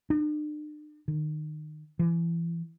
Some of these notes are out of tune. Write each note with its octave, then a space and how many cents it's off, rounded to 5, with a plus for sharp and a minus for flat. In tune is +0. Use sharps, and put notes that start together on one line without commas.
D4 +45
D#3 -25
E3 +30